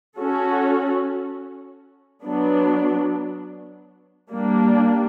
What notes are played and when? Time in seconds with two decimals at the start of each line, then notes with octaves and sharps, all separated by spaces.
0.17 C#4 F#4 A4
2.25 F#3 B3 D4
4.31 G3 A#3 D4